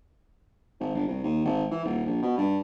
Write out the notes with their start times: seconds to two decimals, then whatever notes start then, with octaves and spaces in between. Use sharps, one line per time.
0.80 G#1
0.94 G1
1.08 C2
1.24 D#2
1.45 G#1
1.71 E3
1.85 D#1
2.06 A#1
2.22 B2
2.38 G2